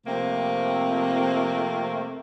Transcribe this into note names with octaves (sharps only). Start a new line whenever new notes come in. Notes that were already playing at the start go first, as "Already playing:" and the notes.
F2 C3 A3 A#3 C4